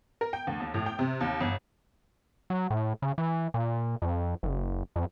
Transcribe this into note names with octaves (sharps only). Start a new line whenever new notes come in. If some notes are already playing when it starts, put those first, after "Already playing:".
A#4
G5
D2
D#2
A2
G5
C3
D#2
G1
F#3
A2
C#3
E3
A#2
F2
F#1
F2